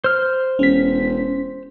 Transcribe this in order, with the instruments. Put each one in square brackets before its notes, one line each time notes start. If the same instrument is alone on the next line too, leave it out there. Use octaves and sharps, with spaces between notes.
[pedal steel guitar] C5 F6
[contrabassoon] E1 [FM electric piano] C#4 B6